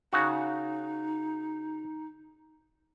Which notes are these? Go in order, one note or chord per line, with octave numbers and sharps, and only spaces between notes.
C#3 D#4 F#4